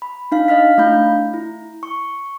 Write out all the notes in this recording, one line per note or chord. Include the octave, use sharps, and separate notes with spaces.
B5
D4 D#4 F5
D#5 F5 F6 B6
A3 D4 E4 F5 B5 G6
E4
C#6